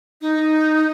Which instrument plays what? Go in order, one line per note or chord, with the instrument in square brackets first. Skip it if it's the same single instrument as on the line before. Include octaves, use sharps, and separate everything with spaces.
[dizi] D#4